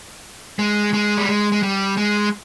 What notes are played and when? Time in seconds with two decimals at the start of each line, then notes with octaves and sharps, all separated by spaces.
0.59 G#3
0.93 G#3
1.18 G3
1.29 G#3
1.52 G#3
1.63 G3
1.97 G#3